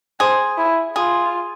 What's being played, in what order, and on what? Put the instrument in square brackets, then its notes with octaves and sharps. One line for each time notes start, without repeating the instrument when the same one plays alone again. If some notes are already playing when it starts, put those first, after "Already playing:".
[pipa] G#4 [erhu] C5
[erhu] E4
[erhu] F4 [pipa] G#4